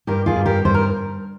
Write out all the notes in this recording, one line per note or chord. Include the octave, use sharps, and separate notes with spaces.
G2 G4 A#4
F4 G#4
G2
G4 A#4
G2 C5
A#4